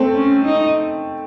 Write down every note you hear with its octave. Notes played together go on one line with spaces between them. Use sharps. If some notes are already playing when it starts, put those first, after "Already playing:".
Already playing: A3 C4
C#4
D#4